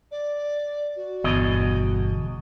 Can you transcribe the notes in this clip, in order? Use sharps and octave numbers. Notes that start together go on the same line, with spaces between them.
D5
F#4
G1 E2 B2 D#5